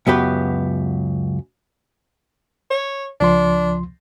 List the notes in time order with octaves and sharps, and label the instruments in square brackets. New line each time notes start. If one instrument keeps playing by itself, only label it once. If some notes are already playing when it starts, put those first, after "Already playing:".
[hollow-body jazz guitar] C#2 F#2 B3 F#4 G4 B4
[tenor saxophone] C#5
[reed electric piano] C#2 F3 C6 [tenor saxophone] D4